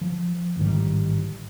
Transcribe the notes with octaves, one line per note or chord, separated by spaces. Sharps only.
F3
A1 G#2 D#3 G3